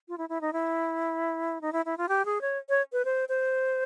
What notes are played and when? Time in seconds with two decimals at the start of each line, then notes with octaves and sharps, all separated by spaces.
0.08 F4
0.18 E4
0.29 E4
0.41 D#4
0.53 E4
1.61 D#4
1.73 E4
1.85 E4
1.97 F4
2.08 G4
2.25 G#4
2.41 C#5
2.69 C#5
2.93 B4
3.05 C5
3.29 C5